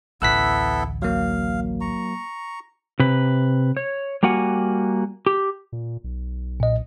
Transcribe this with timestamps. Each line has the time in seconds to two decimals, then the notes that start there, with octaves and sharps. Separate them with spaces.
0.22 A1 D2 B3 E4 A4 E6 F#6 B6
1.02 F#3 A#3 F5
1.81 A#5 C#6
3.00 C3 B4
3.77 C#5
4.23 G3 A#3 F#4 F#5 G#5
5.26 G4
5.72 A#2
6.04 B1
6.60 A#2 D#5